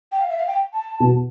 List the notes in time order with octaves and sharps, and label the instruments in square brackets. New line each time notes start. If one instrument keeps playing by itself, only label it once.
[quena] G5
F5
E5
F5
G5
A5
[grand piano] B2